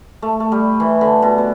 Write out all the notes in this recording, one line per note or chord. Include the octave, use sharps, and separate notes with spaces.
A3
A3
G3
E3
D3
B2
B2